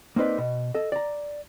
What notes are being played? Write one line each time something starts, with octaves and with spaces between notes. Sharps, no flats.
A#3 C4 D#4 B4 D5
B2
A4 D#5
D5 A#5